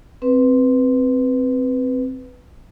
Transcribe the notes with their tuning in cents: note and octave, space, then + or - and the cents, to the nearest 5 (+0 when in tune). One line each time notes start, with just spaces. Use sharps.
C4 +0 B4 +0